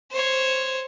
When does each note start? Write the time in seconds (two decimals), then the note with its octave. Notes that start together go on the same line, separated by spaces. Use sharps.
0.11 C5 C#5